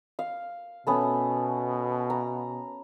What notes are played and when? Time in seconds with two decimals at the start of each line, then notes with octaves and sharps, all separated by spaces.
0.19 F5
0.87 B2 A3 B3 C#4
2.10 A#5